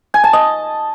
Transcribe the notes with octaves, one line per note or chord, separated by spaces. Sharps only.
G#5
A5
D#5